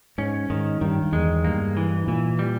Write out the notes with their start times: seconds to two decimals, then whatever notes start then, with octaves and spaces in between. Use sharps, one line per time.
0.18 G#2 C#4
0.50 G#2 D#3
0.81 G2 D#3
1.02 G2
1.12 E2 G#3
1.44 G2 A#3
1.77 E3
2.07 A#2 E3
2.39 G3